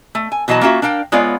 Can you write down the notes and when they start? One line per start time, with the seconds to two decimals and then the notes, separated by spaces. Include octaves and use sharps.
0.15 A3
0.32 G#5
0.48 B2 E3 F#3 D#5 A5
0.61 A#3 C#4 F4 F#4 E5
0.82 D4 A#4 F5 G5
1.12 G#3 B3 F4 C#5 D5 F5